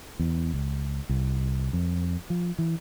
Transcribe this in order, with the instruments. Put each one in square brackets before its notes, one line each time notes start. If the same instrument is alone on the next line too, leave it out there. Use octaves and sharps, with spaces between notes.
[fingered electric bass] E2
C#2
C2
F2
F3
E3